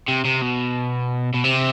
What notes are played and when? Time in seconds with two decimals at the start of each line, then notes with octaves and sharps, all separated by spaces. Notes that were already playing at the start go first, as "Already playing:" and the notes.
0.08 C3
0.25 C3
0.42 B2
1.34 B2
1.44 C3